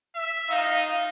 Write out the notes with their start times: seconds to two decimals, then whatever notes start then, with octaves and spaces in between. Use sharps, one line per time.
0.15 E5
0.50 D#4 F5